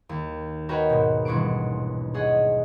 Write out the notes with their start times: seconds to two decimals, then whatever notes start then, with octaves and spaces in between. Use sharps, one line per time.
0.09 D#2
0.69 F#4 A#4 B4 C#5 D#5 G5
0.90 G#2 B2
1.25 D#1 B1 E3 D4 C#6 D7
2.14 G#4 C#5 D#5 F#5